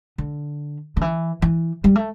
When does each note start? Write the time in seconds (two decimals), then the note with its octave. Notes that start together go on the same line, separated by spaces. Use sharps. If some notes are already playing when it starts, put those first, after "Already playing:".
0.18 D3
0.97 D3
1.01 E3
1.42 E3
1.84 G3
1.96 A3